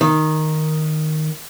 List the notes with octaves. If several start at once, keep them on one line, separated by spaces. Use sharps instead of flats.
D#3